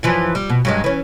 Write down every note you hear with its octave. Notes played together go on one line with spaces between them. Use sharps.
F#2 E3 F3
G3
B2
G2 F#3 G#3
E3 C#4